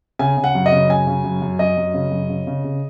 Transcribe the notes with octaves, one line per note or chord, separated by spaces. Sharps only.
C#3 G#5
C#3
F#5
F#2
D#5
C#3
F#2 G#5
C#3
F#2
F#2
F#2 D#5
F#2
C#3
F#2
C#3
C#3
C#3